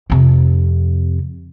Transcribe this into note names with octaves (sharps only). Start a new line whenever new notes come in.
F2 C3